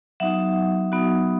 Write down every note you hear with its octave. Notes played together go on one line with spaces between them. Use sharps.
F#3 B3 D#4 F#4 E5 F#5
F#3 B3 D#4 F#4